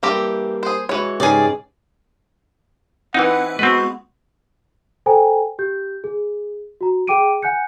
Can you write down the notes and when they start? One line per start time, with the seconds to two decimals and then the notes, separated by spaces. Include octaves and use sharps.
0.03 E3 G3 A#3 C4 D4 G4
0.63 G#4 C5
0.89 E3 G#3 F#4 C#5
1.20 G#2 C#3 G4 G#4 B4 D5 D#5
3.14 E3 C4 D#4 E4 B4 F#5
3.59 G#3 B3 C4 F#4 B4
5.06 A4 C5 G5 G#5 A#5
5.59 G4 G6
6.04 G#4
6.81 F#4 A#5
7.07 G#4 F#5 G5 D6 D7 D#7
7.42 F#5 G#5 F#6 G6 C#7